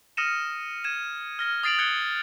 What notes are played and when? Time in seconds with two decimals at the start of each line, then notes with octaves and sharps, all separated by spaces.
0.17 D#6 F6 A#6 C#7 D#7 E7
0.84 G#6 D#7 E7
1.39 F6 A#6 G7
1.63 D#6 A6 C7 D7 F7 F#7
1.78 F#6 G#6 C#7 G7